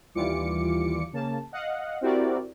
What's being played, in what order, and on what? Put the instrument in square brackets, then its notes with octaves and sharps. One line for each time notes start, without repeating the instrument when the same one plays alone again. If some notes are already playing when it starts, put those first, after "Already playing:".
[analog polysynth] D#2 E3 G3 F4 D6 C#7
C#3 A#3 A5
D#5 F5 F#5
C4 E4 F#4 G4 A#4 D5